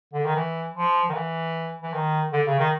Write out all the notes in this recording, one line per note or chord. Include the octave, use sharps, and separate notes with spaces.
D3
D#3
E3
F3
D#3
E3
E3
D#3
D3
C#3
D#3